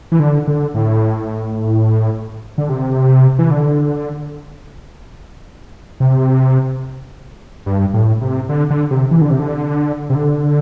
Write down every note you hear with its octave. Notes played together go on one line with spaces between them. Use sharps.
E3
D3
D3
A2
D3
C3
E3
D3
C3
G2
A2
C3
D3
D3
C3
E3
D3
C3
D3
C3
D3